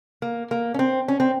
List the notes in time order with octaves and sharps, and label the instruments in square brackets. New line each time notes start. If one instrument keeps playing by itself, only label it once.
[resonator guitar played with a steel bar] A#3
A#3
C#4
C4
C#4
C4